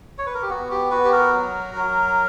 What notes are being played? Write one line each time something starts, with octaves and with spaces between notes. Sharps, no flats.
C#5
B4
A#4
G4
B3 F#4
G4
F#4 B4
G4
A#4
F#3
F#3